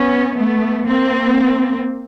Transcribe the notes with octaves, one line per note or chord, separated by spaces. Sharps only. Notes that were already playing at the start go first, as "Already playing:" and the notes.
Already playing: B3 C#4
A3 B3
A#3 C4